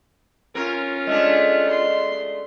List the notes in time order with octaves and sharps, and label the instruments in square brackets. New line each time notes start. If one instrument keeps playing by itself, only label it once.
[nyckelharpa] C#4 F4 [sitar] A#4
[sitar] G#3 A3 D4 [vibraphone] D#5
[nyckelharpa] C6